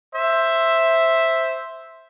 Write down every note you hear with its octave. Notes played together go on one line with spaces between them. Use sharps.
C5 E5